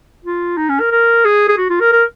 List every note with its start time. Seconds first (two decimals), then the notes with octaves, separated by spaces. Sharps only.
0.24 F4
0.57 D#4
0.69 C#4
0.80 A#4
0.92 A#4
1.25 G#4
1.48 G#4
1.58 F#4
1.69 F4
1.80 A#4
1.92 A#4